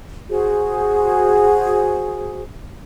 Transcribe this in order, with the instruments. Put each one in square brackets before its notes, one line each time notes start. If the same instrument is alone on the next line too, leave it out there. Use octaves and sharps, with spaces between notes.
[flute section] F#4 G#4 C5